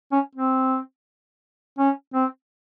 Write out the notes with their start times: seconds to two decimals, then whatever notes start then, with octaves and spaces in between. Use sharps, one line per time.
0.12 C#4
0.35 C4
1.79 C#4
2.14 C4